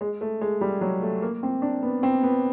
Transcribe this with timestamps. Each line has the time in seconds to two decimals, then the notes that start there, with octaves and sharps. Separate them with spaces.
0.01 G#3
0.21 A3
0.41 G#3
0.61 G3
0.81 F#3
1.02 A3
1.22 A#3
1.43 C4
1.62 D4
1.83 B3
2.03 C4
2.23 B3